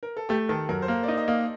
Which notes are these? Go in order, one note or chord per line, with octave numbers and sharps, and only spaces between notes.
A#4
A4
A3 G4
D#3 A4
F#2 A#4
C5
A#3 A#4
D5
D#4
D#5
A#3